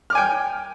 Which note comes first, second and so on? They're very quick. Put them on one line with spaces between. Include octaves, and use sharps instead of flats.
F6 D6 G#5 G5